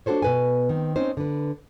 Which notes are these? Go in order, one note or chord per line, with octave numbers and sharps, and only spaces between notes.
D4 F#4 A4 C5 C#5
B2 B4 G#5
D#3 C4
C4 C#4 D#4 C5
D3 B4